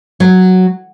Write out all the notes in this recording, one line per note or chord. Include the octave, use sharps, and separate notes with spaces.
F#3